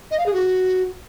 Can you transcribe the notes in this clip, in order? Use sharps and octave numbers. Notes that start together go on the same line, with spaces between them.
D#5
F5
G#4
F#4